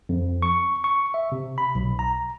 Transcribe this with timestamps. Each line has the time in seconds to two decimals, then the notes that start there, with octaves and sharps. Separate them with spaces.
0.09 F2
0.42 C#6
0.84 C#6
1.14 E5
1.32 C3
1.58 B5
1.75 B1
1.99 A#5